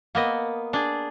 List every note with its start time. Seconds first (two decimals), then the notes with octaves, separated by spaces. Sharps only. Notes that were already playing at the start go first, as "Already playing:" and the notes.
0.15 A#3 B3 D#5
0.73 D4 G#4